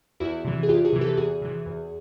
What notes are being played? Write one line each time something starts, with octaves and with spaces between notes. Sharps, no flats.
E2 E4 F#4
C3 E3
G#4
E2 F4 G4
F#4 G#4
C3 E3
G4 A4
E2 F#4 G#4
C3 E3
E2